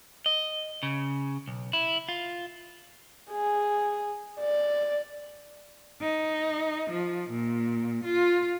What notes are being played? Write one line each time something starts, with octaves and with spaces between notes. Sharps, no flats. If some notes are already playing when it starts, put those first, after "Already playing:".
D#5
C#3
B1
E4
F4
G#4
D5
D#4
F3
A#2
F4